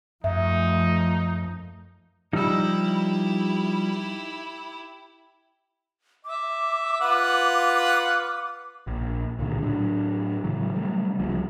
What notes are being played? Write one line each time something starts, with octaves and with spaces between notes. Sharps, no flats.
F#2 F3 A3 D#4 E5
F3 G3 D#4 E4 G4 E6
E5 D6
F4 B4 F#5
A#1
C#2 A#2 D3 D#3
A2 F#3 D4
A2 C#3 E3 F#3
C3 F#3 G3 A3
C#2 C3 F3 G3